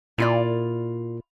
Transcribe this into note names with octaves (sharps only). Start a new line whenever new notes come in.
A#2 E4 F4 D5